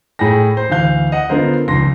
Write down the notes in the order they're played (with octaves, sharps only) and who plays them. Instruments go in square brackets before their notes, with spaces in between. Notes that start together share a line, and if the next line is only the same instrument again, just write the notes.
[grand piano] A2 G#4 G5 A#6
C5
D2 E3 F5 G6
D#5 F#5
D3 B3 F4 A#4 C5
F1 C#2 C6 A#6